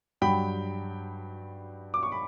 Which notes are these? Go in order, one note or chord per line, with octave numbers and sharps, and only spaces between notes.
G2 F#3 G5 B5
D6
C#6
B5